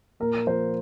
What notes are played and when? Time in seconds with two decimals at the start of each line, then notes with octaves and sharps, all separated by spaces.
0.20 A#2 A#4
0.47 F3 C5